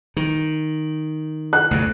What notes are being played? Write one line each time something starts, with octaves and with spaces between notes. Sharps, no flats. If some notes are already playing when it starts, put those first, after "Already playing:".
D#3
F#6
D2 G2 B2